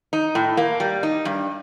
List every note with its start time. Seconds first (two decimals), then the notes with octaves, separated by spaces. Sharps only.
0.13 D#4
0.35 A2
0.57 A#3
0.80 G3
1.03 D#4
1.25 G2